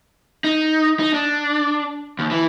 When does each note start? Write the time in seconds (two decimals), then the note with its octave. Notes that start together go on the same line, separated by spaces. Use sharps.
0.44 D#4
0.99 D#4
1.14 D4
2.19 D#2
2.31 E3